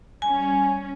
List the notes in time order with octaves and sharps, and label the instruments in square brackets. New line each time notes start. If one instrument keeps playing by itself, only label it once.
[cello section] G3 C#4 [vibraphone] G#5